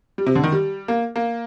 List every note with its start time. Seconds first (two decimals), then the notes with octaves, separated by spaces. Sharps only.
0.18 G3
0.27 C3
0.35 D3
0.44 D#3
0.52 G3
0.88 A#3
1.16 A#3